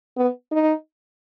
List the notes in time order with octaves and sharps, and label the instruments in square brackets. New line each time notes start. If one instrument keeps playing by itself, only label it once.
[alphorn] B3
D#4